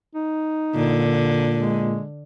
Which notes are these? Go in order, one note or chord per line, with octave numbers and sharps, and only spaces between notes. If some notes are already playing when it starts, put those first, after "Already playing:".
D#4
A#2 D3
G#3